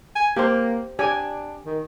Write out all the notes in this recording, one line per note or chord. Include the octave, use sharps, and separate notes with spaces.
G#5
A#3 G4 C5
D4 G4 G#5
D#3